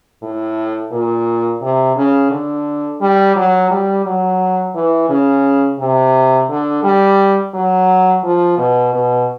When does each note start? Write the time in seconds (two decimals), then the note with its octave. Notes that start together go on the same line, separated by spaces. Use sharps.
0.22 A2
0.92 A#2
1.62 C3
1.96 C#3
2.31 D3
3.01 G3
3.36 F#3
3.71 G3
4.05 F#3
4.74 E3
5.09 C#3
5.80 C3
6.49 D3
6.83 G3
7.54 F#3
8.23 F3
8.57 B2
8.93 B2